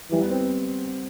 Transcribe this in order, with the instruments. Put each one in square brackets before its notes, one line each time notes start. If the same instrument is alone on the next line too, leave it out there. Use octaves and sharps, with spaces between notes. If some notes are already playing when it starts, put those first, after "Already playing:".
[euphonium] E3 [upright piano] G3
[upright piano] B3
C4